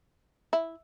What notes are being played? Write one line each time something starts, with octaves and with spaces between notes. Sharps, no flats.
E4